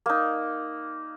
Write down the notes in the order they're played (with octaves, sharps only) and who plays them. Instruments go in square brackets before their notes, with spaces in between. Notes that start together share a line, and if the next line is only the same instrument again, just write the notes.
[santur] A#3 D#4